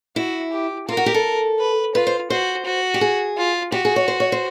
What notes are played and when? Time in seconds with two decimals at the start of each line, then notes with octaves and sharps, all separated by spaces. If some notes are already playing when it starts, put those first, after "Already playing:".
0.16 E4 F#4
0.52 G4
0.88 F4 A#4
0.97 F#4
1.06 G4
1.14 A4
1.59 B4
1.95 F4 B4
2.07 C5
2.30 F#4 C5
2.65 F#4
2.94 G4
3.01 G#4
3.38 F4
3.72 F#4 G4
3.85 G#4
3.96 C#5
4.08 C5
4.20 C#5
4.32 C5